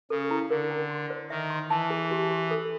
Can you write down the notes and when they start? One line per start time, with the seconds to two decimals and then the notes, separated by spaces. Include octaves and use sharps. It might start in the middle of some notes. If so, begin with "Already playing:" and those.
0.10 C#3 A4
0.30 E4
0.50 D3 A#4
0.70 G5
0.90 C6
1.10 C5
1.30 D#3 E5
1.50 C6
1.70 E3 A5
1.90 G#4
2.11 G4
2.31 G4
2.51 A4